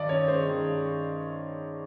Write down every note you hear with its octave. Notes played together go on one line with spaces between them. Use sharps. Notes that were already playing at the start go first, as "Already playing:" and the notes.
Already playing: G2 D#3 D5 D#5
C#4 C#5
G#3 C5
D#3
G2